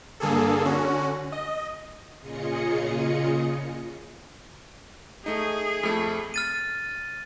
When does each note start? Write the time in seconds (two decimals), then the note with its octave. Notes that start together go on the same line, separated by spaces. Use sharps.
0.20 G2 D3 A#3 G#4 A4
0.65 D3 C#4 F#4
1.32 D#5
2.21 A#2 C#3 F4 G#4 D#5 C#7
5.26 A3 D#4 G#4
5.83 F2 A3
6.34 F6 A6 D#7